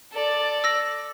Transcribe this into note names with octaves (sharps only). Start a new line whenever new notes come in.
A4 D5
E6 A#6